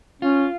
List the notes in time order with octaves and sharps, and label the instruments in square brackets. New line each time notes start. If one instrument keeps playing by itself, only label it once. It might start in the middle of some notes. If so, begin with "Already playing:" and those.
[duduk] C#4 [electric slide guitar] F4